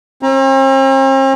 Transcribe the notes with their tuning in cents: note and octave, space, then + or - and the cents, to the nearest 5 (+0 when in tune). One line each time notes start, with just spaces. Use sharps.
C4 +45 A#5 +20